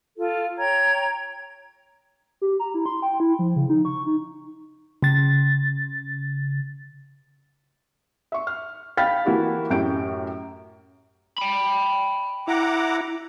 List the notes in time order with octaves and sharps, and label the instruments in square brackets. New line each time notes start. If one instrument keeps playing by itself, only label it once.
[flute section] F4 A4
C#5 G5 A#5 G#6
[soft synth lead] G4
A#5
E4
C6
G5
E4
F3
C#3
D#4
C#6
D#4
[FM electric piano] C#3 A6
[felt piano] E5 C#6
F6
F5 G5 B5 F6 A6 B6
E3 A#3 E4 F#4 G4
F#2 A2 G4 G6 D7
[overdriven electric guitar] G5 B5
[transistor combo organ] E4 [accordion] F#5 A#5 D6